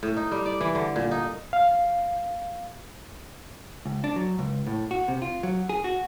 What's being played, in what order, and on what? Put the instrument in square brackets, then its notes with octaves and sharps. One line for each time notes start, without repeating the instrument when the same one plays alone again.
[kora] A2
D#4
G3
D5
E3
D3
A#2
D#4
[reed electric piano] F5
[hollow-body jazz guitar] C#2
D4
F#3
C#2
A2
F#4
C3
F4
F#3
G#4
F#4